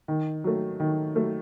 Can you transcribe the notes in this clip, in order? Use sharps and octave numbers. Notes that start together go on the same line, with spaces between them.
D#3
F#3 A3
D#3
F#3 A3